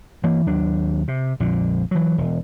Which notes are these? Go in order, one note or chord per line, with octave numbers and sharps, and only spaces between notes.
E3 A#3
D#2 F#3 D4
C3
A#1 F2 A#2 D3
E3 F#3
E1